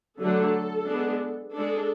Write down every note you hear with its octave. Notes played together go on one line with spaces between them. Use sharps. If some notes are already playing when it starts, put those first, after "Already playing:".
D3 F#3 A3 D4 A4
G#3 B3 D4
G#3 D4 A4